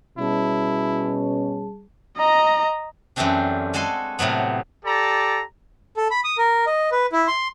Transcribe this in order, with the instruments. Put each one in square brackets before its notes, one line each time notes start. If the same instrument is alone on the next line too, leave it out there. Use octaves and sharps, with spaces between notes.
[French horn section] B2 C#4 [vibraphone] G3 G#4 A5 [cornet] E4
[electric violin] D#5 A#5
[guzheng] F#2 E3 G3 A3 C4 D4
G#3 F#4 A4 G#5 C6
A2 C3 F#3 B3
[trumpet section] G4 A4 D5 A#5
[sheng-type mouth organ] A4
B5
D#6
A#4
D#5
B4
E4
C6